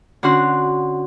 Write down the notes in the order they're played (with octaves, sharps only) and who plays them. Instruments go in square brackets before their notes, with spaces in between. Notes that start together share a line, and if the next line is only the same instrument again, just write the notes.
[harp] D3 C#4 F#4 C6 F#6